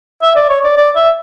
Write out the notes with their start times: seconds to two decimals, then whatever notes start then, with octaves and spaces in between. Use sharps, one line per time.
0.22 E5
0.36 D5
0.49 C#5
0.64 D5
0.77 D5
0.96 E5